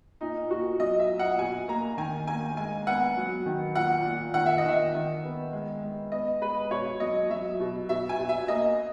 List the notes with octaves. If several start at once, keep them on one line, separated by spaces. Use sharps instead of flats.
A#2 D#4
A#3 F#4
F#3 D#5
E5
A#2
F#5
B2 G#5
A#3 A#5
D#3 G#5
A#3 G#5
G#3 G#5
B3 F#5
F#3
D#3
A#2 F#5
A#2
D#3 F#5
E5
D#5
D#3 E5
D#3
B3
G#3
G#3
B3 D#5
G#3 B4
B2 C#5
F#3 D#5
F#3 E5
B2
B2 E5
G#5
B2
E5
A#3 D#5